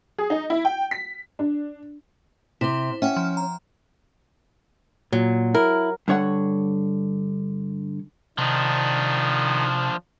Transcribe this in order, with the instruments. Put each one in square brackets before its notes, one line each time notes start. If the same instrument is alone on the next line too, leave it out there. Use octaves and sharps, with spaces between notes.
[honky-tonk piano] G#4
D#4
E4
G5
B6
D4
[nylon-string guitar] C3 [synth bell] E4 C5
[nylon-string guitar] C#4 [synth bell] E5 F#5 G5
[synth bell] F3
A#5
[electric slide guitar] A#2 [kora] F#3
[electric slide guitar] E4 [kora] A#4
[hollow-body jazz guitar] G2 D3 C#5 F#5
[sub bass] C3 [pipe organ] D#3 [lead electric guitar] F3 D4